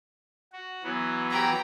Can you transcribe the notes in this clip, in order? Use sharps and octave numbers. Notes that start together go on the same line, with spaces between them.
F#4
E3 F#3 B3
G4 A#5